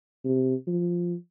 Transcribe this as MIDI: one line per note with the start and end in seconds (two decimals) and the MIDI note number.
0.25 0.55 48
0.67 1.14 53